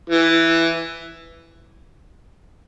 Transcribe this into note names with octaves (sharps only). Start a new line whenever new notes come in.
E3